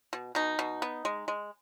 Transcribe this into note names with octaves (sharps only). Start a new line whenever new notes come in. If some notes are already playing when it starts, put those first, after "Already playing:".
B2
B2 D#4
B2
B3
G#3
G#3